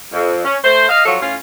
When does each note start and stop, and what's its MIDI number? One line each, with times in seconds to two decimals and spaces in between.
0.13 0.43 41
0.45 0.56 61
0.64 0.86 57
0.64 0.86 72
0.89 1.04 75
0.89 1.04 77
1.06 1.17 53
1.06 1.17 54
1.06 1.17 65
1.06 1.17 69
1.06 1.17 73
1.21 1.35 45
1.21 1.35 61
1.21 1.35 65